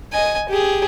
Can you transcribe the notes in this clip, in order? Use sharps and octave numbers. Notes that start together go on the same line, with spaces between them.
D#5 G#5
G4 G#4